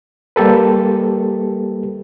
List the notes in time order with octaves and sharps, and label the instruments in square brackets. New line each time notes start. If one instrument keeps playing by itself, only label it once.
[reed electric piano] G3 A#3 G4 A4 B4